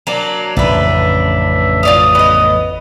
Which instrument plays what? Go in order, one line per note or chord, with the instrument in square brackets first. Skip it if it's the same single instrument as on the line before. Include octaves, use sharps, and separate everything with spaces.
[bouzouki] F#3 A#3 D4
[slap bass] A1 F2 C#3 [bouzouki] D4 B4 [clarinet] E5
[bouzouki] F4 D5 F5 [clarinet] D#6
[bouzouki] B3 D#5